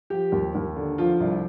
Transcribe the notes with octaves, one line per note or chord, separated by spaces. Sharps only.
F3 G4
D#2
D#2
D3
F3 F4
C2